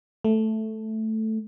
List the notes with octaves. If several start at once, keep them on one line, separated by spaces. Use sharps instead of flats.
A3